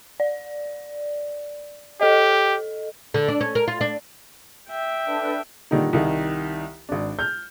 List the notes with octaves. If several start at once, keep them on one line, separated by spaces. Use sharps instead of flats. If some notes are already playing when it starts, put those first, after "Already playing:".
D5
G4 A4 D#5
D3
D4
C#4
A#4
F4
D4
E5 G5
D4 A4 B4
A#2 D3 D#3 G3 D#4
C2 D#3
G#1 D4
F6 G6